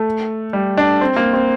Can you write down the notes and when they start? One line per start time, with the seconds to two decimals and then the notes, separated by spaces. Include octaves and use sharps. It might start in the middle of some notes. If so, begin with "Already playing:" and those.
Already playing: A3
0.53 G3
0.77 D4
1.01 C4
1.16 A#3
1.33 C4